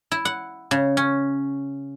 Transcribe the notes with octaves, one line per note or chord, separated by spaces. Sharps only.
E4
F#5
C#3
C#4